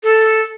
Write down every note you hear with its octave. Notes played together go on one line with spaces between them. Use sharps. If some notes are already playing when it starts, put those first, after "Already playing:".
A4